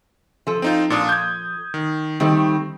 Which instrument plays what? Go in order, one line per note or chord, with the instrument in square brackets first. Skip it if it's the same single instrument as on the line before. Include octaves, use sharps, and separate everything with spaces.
[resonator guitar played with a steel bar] F3 A4
[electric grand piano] C4 D#4 F4
A#2 D4 D#6
G6 G#6
D#3
[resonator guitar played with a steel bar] D#3 G3 A3 [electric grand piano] C4